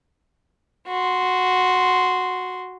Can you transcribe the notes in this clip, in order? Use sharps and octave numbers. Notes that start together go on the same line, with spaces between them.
F#4 C6